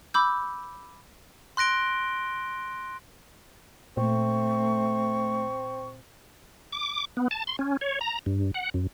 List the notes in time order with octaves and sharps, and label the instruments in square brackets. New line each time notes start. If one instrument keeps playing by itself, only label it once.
[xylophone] B5 D6 E6 G6
[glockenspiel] C6 F#6 A#6 D7 G7
[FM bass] A#2 [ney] A3 [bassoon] C4 [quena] C#6
[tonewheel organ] D6
B3
A5
C6
C#4
C#5
A#5
G2
F#5
F#2